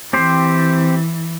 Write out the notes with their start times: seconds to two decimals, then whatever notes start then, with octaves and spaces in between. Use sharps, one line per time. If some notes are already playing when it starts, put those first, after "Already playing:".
0.13 E3 C4 G4 C5